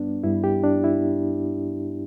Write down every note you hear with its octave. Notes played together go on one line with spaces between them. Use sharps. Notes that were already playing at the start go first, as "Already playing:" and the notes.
Already playing: G2 G3 B3 D4
G2 G3 E4
G4
D4
E4